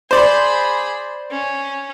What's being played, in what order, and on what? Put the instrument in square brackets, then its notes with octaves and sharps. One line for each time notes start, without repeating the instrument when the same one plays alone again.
[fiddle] G#4 B5 [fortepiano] C5 D5
[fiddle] C#4